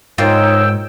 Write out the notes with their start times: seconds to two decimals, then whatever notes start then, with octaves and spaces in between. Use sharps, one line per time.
0.18 G#2 D#4 F4 A#4 C#5 G5 E6